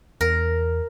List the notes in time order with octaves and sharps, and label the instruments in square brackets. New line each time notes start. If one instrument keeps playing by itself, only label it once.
[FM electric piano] E2 [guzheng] A#4